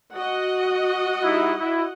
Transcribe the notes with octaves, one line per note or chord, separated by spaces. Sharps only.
F#4 D#5 F#5
G3 D#4 E4
E4